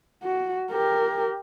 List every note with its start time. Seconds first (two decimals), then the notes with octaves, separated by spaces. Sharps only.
0.24 F#4
0.73 G4 A#4